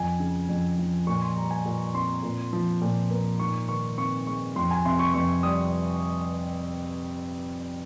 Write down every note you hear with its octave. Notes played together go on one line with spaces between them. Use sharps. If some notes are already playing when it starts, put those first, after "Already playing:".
Already playing: F2 G#5
C#3
F2
F3
A#2 C#6
C6
G3 A#5
G#5
A#2 G#5
C4 C6
A#2
F3
A#2
A#3
G#2 C#6
D#3 C#6
C4 C#6
G#3 C#6
F2 C6
G#5
C3 C6
C#6
F2 C#6
G3 D#6